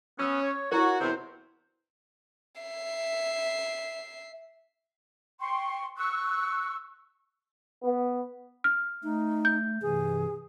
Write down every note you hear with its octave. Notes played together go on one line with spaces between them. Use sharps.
B3 C#4 E6
C#5
E4 F#4 A#4 C#5
E2 G2 C3 C5
E5 C7
G5 C6 C#6
C#6 E6 F#6
B3
F6
A3 D#4
G6
G2 C3 E3 G#4